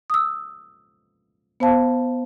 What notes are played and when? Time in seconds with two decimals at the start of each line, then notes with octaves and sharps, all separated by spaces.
0.10 D#6 E6
1.60 B3 C5 F5 A5